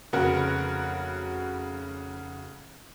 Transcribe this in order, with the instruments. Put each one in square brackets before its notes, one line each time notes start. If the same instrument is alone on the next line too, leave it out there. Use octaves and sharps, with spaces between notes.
[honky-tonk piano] F1 C#3 F#4 A#4 B4 F#5